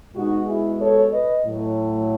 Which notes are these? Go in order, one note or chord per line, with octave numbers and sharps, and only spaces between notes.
B2 G#3 D#4 F#4
E4 G#4
A4 C#5
B4 D#5
A2 F#3 A3